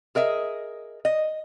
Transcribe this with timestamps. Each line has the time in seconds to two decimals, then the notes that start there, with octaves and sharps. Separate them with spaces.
0.15 G#4 A#4 D#5 E5
1.05 D#5